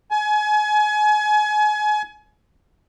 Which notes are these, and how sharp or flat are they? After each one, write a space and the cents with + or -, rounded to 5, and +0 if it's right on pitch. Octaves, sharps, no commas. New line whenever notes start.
G#5 +30